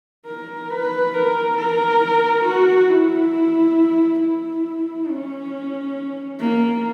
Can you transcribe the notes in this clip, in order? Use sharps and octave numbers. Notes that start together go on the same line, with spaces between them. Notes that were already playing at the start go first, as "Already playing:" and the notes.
A#4
B4
A#4
A#4
F#4
E4
E4
C#4
A#3